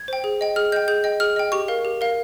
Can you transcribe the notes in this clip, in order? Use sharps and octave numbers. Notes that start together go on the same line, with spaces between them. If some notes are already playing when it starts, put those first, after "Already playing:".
Already playing: G#6
C5 G5
G#4
D#5 G5
G#4 F6
D#5 G5 G6
G#4 G6
D#5 G5
G#4 F6
D#5 G5
G4 C#6
A#4 F5
G4
A#4 F5